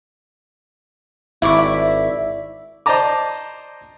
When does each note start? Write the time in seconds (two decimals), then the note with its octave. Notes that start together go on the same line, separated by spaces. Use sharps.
1.42 G#1 E4 D5 E5 C#6
2.86 C5 D5 D#5 A5 A#5 D6